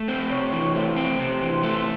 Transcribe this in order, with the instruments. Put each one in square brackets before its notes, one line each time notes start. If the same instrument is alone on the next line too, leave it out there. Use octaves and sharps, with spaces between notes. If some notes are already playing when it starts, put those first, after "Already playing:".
Already playing: [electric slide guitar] A3
C4
[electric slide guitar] C3 [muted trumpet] C#5
[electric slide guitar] E3
[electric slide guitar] A3 [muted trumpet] C5
[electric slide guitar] C4
C3
E3
A3